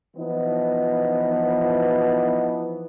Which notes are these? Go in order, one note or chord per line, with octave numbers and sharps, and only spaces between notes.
E3 F3 B3 D#4